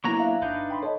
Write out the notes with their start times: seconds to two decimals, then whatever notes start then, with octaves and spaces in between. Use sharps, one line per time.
0.04 D3 F#3 A#3 B3 E4 A#5 C#6
0.20 E5 F5
0.42 G1 D4 D#4 B4 G6
0.70 G5 B5 C6
0.83 A4 C#5 D#5 A5